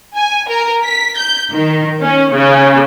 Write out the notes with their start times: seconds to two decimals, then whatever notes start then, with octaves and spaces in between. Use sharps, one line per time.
0.16 G#5
0.49 A#4
0.83 B6
1.17 G6
1.52 D#3
2.01 C#4
2.32 C#3